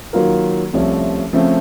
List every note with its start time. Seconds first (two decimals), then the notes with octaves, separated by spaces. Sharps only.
0.13 D#3 F#3 A#3 F4 A#4
0.73 C2 C3 F3 A3 C#4
1.33 C#3 F3 A3 C4